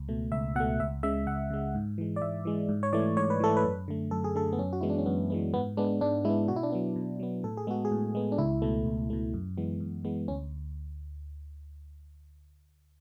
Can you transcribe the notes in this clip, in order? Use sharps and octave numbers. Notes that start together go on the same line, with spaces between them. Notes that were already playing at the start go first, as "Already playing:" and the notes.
Already playing: C#2
B2 A3
C#2 E5
B2 A3 F#5
C#2 E5
C#3 G#3 E5
C#2 F#5
C#3 G#3
G#2
E3 G#3
D5
G#2 E5
E3 G#3
G#2
C#5
E3 A3 D5
G#2 C#5
B4
E3 A3 A4
B4
F#2
D3 A3
F#2 A4
G#4
D3 A3 A4
B3
F#2 C#4
F#4
E3 G#3 B3 E4
D4
C#4
F#2 B3
E3 G#3 B3
G#2 B3
G#3 B3 D4
G#2 D4
G#3 B3 E4
B2 F#4
E4
D4
F#3 B3 E4
B2
F#3 B3
A2 A4
G#4
G#3 B3 F#4
G#4
A2
G#3 B3
D4
C#2 E4
B2 A3
C#2
B2 A3
F#2
E3 G#3 B3
F#2
E3 G#3 B3
D2 C#4